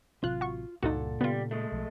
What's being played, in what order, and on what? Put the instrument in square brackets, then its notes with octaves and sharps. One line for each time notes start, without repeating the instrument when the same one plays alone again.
[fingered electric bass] A1 C3 F#3 [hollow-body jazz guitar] F4 [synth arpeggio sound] F#6
[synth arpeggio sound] F#4 C#6
[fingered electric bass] C#2 G2 [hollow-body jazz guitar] A#2 A4 F#5 [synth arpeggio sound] D#4 F#4
[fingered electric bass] C#3 [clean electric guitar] G3 [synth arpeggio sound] B3 F4
[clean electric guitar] G#3 A3
[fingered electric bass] B1 F3